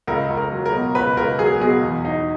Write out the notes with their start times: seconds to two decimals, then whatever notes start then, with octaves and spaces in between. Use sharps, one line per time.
0.07 C#2 A#4
0.30 C#2
0.37 A#4
0.52 F#3
0.66 A#4
0.73 B2
0.95 C#2 B4
1.17 C#2 A#4
1.39 F#3 G#4
1.61 B2 G#4
1.82 E2
2.05 D#4